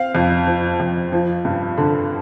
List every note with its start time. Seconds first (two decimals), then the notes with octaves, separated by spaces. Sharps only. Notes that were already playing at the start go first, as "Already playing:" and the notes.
Already playing: C4 F5
0.15 F2
0.47 F3
0.80 F2
1.12 F3
1.45 G2
1.77 D3